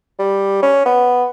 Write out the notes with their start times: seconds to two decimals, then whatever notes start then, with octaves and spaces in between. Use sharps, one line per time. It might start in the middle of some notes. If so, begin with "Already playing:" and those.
0.19 G3
0.62 C#4
0.86 B3